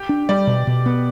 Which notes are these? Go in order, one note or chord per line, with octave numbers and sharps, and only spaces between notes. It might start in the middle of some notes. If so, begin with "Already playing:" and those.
Already playing: G4 G5
D4
G3 D5
B2
B2
B3